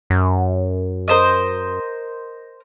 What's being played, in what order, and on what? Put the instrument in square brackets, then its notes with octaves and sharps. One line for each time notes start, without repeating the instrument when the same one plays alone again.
[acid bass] F#2
[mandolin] A#4 C5 D#5